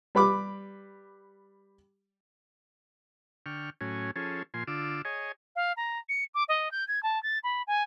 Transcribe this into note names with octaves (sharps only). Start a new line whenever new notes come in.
G3 B4 B5 D6
D3 G5 C#6 F6
A2 F#3 C#4 G#5
F3 C#4 G#4 A4
A#2 F3 G#5 C6
D3 F4 D6 E6
G#4 C#5 D#5 G#5
F5
A#5
C#7
D6
D#5
G6
G#6
A5
A6
B5
G#5